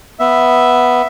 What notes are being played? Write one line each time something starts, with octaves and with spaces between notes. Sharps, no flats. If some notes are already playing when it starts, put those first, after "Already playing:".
B3 E5